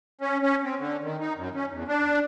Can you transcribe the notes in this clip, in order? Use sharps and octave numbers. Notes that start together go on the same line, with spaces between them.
C#4
C#4
C4
D3
D#3
D#4
F#2
C#4
E2
D4